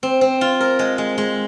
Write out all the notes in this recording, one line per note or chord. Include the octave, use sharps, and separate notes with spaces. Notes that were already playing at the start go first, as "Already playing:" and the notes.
C4
C4
F4
A#4
G#3
G#3
G#3